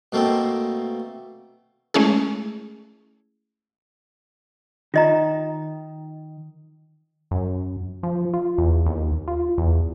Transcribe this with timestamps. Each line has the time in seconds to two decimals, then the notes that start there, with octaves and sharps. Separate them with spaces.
0.12 B2 A3 A#3 C4
1.94 G#3 A3 C#4 E4 G#4
4.94 D#3 F4 D#5 A#5
7.31 F#2
8.03 F3
8.33 F4
8.58 E2
8.86 D#2
9.28 F4
9.58 E2